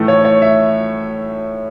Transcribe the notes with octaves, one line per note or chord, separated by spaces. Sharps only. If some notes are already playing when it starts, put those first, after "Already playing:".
Already playing: A2 E3 A3
C#5
C#5
E5